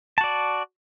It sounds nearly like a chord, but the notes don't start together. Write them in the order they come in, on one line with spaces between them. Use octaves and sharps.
A5 F#4 D5